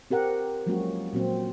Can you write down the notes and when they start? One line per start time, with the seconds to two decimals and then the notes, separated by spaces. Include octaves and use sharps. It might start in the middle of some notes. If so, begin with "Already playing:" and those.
0.10 C4 G4 A#4 F#5
0.66 F3 F#3 G#3 A#3 C#4 F#4
1.13 A#2 F#3 C4